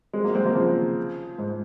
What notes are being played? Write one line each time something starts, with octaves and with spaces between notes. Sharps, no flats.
G#3 C4
F#3 A#3
G#3 C4
F#3 A#3
C#3 F3
G#2